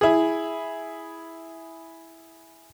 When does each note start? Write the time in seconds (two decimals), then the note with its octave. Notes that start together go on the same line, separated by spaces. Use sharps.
0.01 E4 G#4